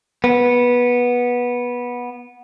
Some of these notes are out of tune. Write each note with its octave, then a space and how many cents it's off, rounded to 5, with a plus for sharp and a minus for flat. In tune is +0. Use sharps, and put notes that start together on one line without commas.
B3 -15